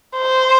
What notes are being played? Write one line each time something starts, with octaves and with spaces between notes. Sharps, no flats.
C5